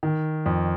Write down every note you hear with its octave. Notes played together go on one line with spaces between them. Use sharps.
D#3
F2